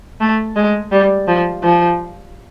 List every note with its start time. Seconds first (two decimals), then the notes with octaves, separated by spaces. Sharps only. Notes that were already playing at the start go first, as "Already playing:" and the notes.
0.20 A3
0.56 G#3
0.92 G3
1.28 F3
1.63 F3